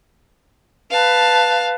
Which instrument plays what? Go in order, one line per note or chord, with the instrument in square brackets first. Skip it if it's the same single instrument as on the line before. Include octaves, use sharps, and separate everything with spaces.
[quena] B4 [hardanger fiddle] F5 A5